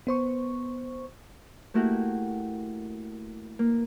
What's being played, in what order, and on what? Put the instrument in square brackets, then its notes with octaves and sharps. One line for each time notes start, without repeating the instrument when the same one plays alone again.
[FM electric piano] B3 C5 C#6
[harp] A3 A#3 E4 F#4 G4
A#3